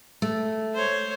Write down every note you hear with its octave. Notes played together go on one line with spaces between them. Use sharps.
A3
C5 C#5